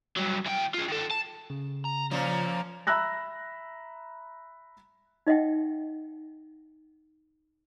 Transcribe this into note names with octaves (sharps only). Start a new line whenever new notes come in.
G2 F#3
E3 G5
F4 G#4
D#3 A4
A5
C#3
A#5
A#2 F3 A#3 C#4 C5
E5 A#5 B5 E6 F#6 A#6
D#4 D#5 E5 F#5 G5